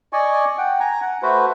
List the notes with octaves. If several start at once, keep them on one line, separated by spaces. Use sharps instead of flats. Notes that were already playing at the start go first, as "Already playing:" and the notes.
D5 D#5 G#5 C#6
F#5 G5
G#5 A#5
F#5
A3 F#4 B4 C5